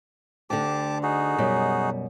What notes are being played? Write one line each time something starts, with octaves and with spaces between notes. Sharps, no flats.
D2 D3 G4 A5 D6
D#4 F#4 G#4
F#2 B2 G3